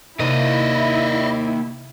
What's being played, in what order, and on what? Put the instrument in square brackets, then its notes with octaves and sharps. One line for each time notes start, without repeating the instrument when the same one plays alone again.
[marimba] C3 [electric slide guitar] A#3 D#4 A#4 [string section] E4 [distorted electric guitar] D5 D#5